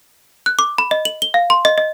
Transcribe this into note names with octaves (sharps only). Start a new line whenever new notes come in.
F#6
D6
B5
D#5
F#7
G7
F5
C6
D#5
D#5